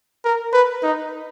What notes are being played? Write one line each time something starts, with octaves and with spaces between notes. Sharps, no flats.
A#4
B4
D#4